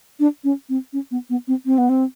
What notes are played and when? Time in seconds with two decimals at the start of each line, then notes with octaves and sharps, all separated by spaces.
0.20 D4
0.44 C#4
0.69 C4
0.93 C#4
1.11 B3
1.30 B3
1.48 C4
1.66 C4
1.78 B3
1.89 C4